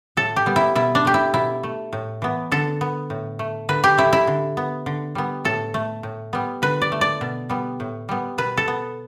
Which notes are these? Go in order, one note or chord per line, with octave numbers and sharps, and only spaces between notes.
A2 A4
G4
G3 B3
E4
B2 E4
D4
A3 G4
E4
B2 E4
A3
A2
E3 B3
D3 A4
B3
A2
A3
D3 B4
G4
A3 E4
E4
D3
B3
D3
G3 B3
A2 A4
A3
A2
G3 B3
D3 B4
D5
A3
D5
B2
G3 B3
A2
G3 B3
B2 B4
A4
B3